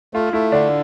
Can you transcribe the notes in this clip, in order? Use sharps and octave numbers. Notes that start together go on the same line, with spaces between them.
A3 F4
A3 E4
D3 D4